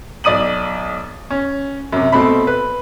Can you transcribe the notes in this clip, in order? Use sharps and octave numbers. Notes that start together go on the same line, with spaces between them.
B1 D5 D#6 D#7 F#7
C#4
F#2 C3
B2 A3 C4 B5
B4